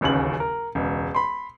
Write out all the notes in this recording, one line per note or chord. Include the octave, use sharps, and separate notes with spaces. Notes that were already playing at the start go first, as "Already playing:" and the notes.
D1 A1 D#2 C#3 F#7
A#4
E1 C#2
B5 C6